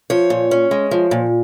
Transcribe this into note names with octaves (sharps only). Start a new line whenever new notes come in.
F3 C#5
A#2
C#4
G#3
F3
A#2